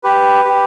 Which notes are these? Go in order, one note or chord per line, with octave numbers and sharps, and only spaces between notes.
G4 B4
G4